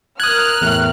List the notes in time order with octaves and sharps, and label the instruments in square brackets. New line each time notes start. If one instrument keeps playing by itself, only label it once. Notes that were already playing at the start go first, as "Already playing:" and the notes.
[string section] A#4 F6 [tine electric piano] D#6 G#6 [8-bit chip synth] F#6
[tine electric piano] E2 [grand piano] A2 A3